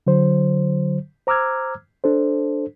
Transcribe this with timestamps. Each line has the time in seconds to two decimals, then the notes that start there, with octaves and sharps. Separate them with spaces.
0.07 D3 F#3 C5
1.27 C5 A#5 D6 E6 F6 G#6
2.04 D4 A4 C5